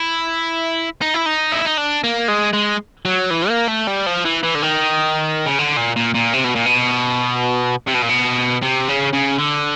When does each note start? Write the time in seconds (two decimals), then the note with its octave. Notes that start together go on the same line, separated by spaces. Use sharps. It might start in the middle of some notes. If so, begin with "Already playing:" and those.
Already playing: E4
1.01 D#4
1.14 E4
1.26 D#4
1.52 E4
1.65 D#4
1.77 D4
2.04 A#3
2.28 G#3
2.53 G#3
3.05 F#3
3.30 E3
3.49 A#3
3.68 A3
3.87 G3
4.06 F3
4.25 E3
4.43 E3
4.55 D3
4.62 D#3
5.46 C#3
5.59 D3
5.77 A#2
5.96 A#2
6.15 A#2
6.34 C3
6.44 B2
6.55 A#2
6.66 B2
7.87 C3
7.94 B2
8.02 A#2
8.09 B2
8.62 C3
8.88 C#3
9.13 C#3
9.38 D3